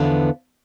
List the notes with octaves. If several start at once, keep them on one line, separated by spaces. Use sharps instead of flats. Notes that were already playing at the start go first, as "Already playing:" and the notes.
Already playing: E2 D3 F3 B3